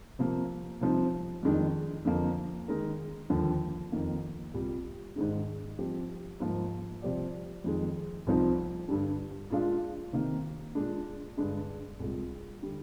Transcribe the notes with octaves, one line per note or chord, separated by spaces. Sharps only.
C3 F3 A#3
C3 F3 C4 D#4
F2 D#3 G#3 D4
F2 D3 F3 A#3
D#3 G#3 D#4 A#4
D#2 D3 F3
F2 D#3 A#3
C2 A#2 G3
G#2 D#3 G#3 D4
F3 C4 G4
G#2 F3 A#3
C3 F3 C4 G4 D5
F2 D#3 G#3
C2 A#2 F3 C4 D#4
G2 D3 G3 D4
A#2 G#3 D4 F4
C3 D#3 A#3
A#2 G#3 D4
G2 D3 G#3 D4
C2 A#2 G#3
D3 G3